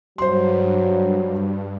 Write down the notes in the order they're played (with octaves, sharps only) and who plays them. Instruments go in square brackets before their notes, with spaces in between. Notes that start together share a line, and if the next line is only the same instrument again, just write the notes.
[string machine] G2 [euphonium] F#3 [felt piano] C5 C6